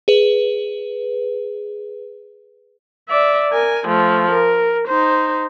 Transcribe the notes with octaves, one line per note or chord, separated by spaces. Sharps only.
G#4 B4
D5 E5
A#4 G#5
F3 A3
A#4
D#4 C5